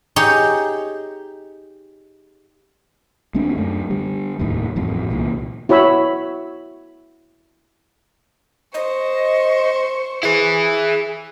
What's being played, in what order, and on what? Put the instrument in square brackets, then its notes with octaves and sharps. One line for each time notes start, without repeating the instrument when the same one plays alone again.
[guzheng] D#4 G4 G#4 C#5
[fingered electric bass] D2 G#3 C4 D4
F#2 A3
D3 G3
F1 D#2 A2 D#3
A1 F2 G#2
C2 A#2 C#3 E3
[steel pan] E4 F#4 C#5 B5 E6
[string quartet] C5 C#6 [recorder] D#5
[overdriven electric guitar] E4 B4 [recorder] G#4